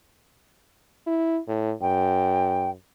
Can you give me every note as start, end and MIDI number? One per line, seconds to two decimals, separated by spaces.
1.06 1.39 64
1.48 1.73 45
1.82 2.73 42
1.82 2.70 79